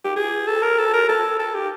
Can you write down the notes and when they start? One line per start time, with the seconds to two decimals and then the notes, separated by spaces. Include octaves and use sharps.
0.05 G4
0.16 G#4
0.47 A4
0.62 A#4
0.78 A4
0.93 A#4
1.09 A4
1.39 A4
1.55 G4